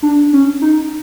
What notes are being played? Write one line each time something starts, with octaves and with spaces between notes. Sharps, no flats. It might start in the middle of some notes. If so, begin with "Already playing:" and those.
D4
C#4
D#4